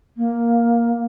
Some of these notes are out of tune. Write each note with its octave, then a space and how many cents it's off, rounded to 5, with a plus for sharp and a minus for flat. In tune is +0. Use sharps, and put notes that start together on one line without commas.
A#3 +5